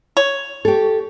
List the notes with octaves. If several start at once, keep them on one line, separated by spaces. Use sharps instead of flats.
C#5
G4 A4